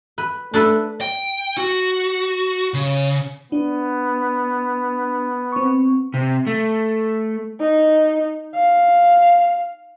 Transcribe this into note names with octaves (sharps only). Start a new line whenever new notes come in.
B4
A3 D4 A4 B4
G5
F#4
C#3
B3 D4
C4 C#6
C3
A3
D#4
F5